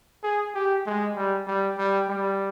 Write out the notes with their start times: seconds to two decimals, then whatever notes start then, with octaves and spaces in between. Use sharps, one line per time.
0.23 G#4
0.54 G4
0.86 G#3
1.16 G3
1.47 G3
1.78 G3
2.09 G3